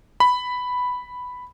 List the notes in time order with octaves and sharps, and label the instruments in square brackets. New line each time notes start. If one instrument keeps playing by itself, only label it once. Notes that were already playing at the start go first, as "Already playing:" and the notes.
[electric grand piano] B5